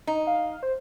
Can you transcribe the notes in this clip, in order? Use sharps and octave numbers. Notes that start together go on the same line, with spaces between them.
D#4
F5
C5